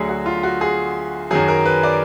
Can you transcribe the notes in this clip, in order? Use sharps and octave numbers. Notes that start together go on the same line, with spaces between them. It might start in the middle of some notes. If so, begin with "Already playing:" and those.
Already playing: D2 D3 F#3 G#4
F#4
F4
F#4
G#4
F#2 D#3 F#3 G#4
A#4
B4
D5